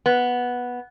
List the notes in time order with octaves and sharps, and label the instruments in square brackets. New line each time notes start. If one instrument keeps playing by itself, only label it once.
[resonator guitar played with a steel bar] B3